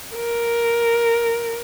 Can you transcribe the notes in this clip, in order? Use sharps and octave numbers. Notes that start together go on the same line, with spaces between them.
A#4